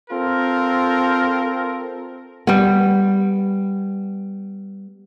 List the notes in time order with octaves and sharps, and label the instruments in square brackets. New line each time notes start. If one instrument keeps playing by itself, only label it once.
[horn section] C4 F4 A4 A#4
[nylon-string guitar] G3 B3